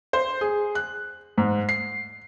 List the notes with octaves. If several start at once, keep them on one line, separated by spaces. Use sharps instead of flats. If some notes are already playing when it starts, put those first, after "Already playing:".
C5
G#4
F#6
G#2
C7